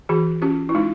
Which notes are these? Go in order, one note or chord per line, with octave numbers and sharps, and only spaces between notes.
E3 F#4 G#4
C#4 F4 G4
E4
G#3 D#4 F4